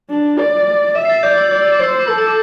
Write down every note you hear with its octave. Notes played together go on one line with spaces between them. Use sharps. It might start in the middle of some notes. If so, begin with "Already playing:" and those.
D4
D5
E5
C7
A6
D5 G6
E6
D5 G6
E6
D6
C5 E6
D6
A4 E6
E6
D6